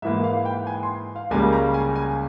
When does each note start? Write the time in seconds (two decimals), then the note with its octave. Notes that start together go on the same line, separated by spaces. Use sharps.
0.02 G#2 E3 A#3 E5
0.24 F5
0.45 G5
0.67 G#5
0.83 C6
1.16 F5
1.31 C#2 C#3 G3 A#3 G#5
1.53 A#5
1.74 G#5
1.96 G#5